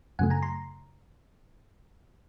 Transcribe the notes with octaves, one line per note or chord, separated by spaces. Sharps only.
F#2 C#3 F#3 A3 F#5 G#5
G#5 A#5
A#5 C6